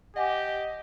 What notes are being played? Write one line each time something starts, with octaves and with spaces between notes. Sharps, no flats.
G4 D#5 F#5 G#5 D6